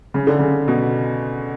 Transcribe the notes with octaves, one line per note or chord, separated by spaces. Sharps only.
C#3
D3
C#3
B2